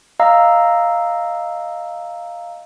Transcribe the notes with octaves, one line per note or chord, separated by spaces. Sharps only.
D#5 F5 A#5 E6